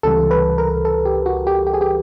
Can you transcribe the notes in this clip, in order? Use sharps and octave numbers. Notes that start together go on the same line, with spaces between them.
C#2 C3 E3 G3 A4
B4
A#4
A4
G4
F#4
G4
G4
G#4
G4